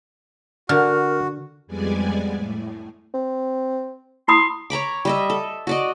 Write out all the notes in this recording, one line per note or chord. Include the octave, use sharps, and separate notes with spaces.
D3 F#4 A#4 F6
F2 G3 G#3 B3 D5 G#5
A2
C4
E4 B5 C6 D#6
C#5 A#5 B5 D6
G3 D#5 E5
A4
F#4 D5 D#5